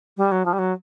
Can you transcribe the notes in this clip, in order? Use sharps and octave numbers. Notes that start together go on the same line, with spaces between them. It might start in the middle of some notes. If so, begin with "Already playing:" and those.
G3
F#3
F3
G3
F#3